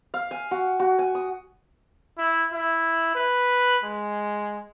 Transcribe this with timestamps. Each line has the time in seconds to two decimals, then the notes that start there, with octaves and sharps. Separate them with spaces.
0.14 F5
0.31 G#5
0.51 F#4
0.80 F#4
0.99 G#5
1.15 D#6
2.18 E4
2.53 E4
3.15 B4
3.84 G#3